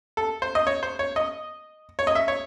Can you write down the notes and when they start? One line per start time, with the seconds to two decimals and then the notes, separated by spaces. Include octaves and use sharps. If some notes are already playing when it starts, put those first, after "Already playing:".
0.17 A4
0.42 C5
0.55 D#5
0.67 C#5
0.83 C5
0.99 C#5
1.16 D#5
1.99 C#5
2.07 D#5
2.15 E5
2.28 C#5